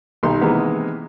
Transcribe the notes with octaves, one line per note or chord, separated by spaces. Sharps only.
B1 D#3 G3 D#4 C6
C3 D#3 E3 G#3 A#3 B3